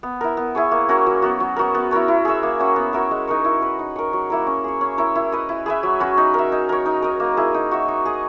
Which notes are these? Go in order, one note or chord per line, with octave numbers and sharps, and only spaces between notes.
B3
E4 A#4
B3
E4 G#4 C#5
A#3
C#4 F#4 A#4
F#3
B3 F#4
F#3
B3 F#4 A#4
B3
E4 A#4 C#5
E4
G#4 C#5 E5
A#3
C#4 F#4 C#5
B3
F#4 A#4 E5
G#3
D#4 A#4 C#5
E4
B4 D#5
D#4
A#4 C#5
F#3
A#3 E4 A#4
C#4
G#4 C#5
C#4
E4 A#4 C#5
E4
B4 D#5
E4
G#4 B4 E5
F#3
C#4 F#4 B4
D#4
A#4 E5
D#4
A#4 C#5
D#4
A#4 D#5
A#3
E4 G#4
D#4
F#4 C#5 E5
D#4
G#4 D#5